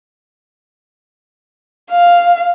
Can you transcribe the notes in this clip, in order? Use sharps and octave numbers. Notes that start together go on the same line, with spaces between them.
F5